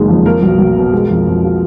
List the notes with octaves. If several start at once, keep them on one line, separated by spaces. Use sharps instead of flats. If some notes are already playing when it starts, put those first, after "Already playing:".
Already playing: F#1 D#3 G#3
F2
A#3 A#4
B1
B1
B2
G#3
F2
F2
F3